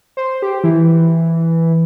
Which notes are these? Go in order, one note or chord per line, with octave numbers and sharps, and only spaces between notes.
C5
G4
E3